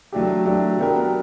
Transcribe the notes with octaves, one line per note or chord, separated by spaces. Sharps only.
F#3 A3 D4 G4
F#3 A3 D4 G4
F#3 B3 D4 G4 A#4